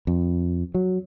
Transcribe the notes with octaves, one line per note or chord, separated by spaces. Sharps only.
F2
F#3